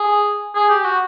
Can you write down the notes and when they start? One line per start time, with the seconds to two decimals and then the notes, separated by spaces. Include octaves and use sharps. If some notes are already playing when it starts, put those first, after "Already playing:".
Already playing: G#4
0.55 G#4
0.69 G4
0.84 F#4